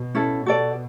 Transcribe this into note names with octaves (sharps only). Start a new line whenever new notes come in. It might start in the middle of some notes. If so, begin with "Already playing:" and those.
Already playing: B2
C#4 E4 A4
B2 F#4 A4 D5